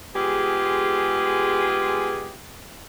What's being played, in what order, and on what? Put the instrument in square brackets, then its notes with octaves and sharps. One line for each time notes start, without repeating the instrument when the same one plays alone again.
[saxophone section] G#3 B3 F4 G4 G#4